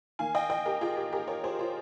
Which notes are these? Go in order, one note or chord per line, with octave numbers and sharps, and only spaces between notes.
D#3 A#3 F5 G#5
D#5 G5
D#5 G5
G4 A#4
F4 G#4
G4
G4 A#4
A#4 C#5
G#4 C5
F4